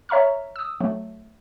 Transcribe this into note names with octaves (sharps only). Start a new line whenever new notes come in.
C#5 E5 A#5 C#6 F6
D#6 E6
F#3 A3